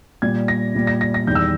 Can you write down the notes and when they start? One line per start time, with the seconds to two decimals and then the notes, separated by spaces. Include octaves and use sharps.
0.22 A#2 G3 G#6
0.48 A#6
0.75 A#2 G3
0.87 A#6
1.01 A#6
1.14 A#6
1.27 E2 D#3 G3 G6
1.35 E6